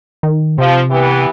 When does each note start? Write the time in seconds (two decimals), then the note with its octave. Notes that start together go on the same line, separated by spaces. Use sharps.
0.23 D#3
0.58 C3 F3
0.90 E3 B3 G4